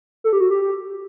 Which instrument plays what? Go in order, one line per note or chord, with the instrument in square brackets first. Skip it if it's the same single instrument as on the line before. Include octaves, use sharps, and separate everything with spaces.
[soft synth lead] A4
G4
F#4
G4